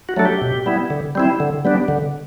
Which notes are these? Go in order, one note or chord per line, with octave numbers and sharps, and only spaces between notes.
F#4
F#3 A3 D4 A4
G4
B2
G3 B3 E4
D3
G3 C4 E4
D3
G3 B3 D4
D3